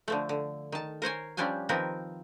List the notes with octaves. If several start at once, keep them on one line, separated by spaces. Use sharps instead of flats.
D3 F3 A3
D3
D#3 A5
A#4 C5 C#5 G#5
F3 G3 C#4 D4 G4 G#5
D#3 F3 C4 F4 A#4 B4